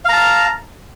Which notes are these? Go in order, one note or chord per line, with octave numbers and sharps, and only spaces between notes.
F5 A5 A#5